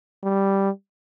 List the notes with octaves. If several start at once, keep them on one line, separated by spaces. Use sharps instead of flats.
G3